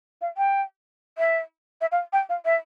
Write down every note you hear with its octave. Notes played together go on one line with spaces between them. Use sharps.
F5
G5
E5
E5
F5
G5
F5
E5